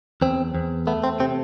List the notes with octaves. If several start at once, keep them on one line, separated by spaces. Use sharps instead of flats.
E2 C4
E2
A3 B3
C4
C3 C4